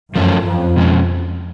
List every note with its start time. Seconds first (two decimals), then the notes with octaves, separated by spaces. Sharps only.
0.15 F#2 F3 A3 C#4
0.46 F2
0.76 B2 G#3 C#4